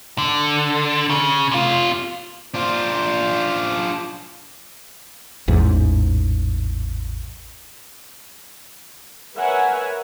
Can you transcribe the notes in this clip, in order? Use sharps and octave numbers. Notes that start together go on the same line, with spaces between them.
D3
C#3
C3 F4
D4 F4 C5
A1 E2 G#2
A#4 B4 C#5 E5 F#5 G#5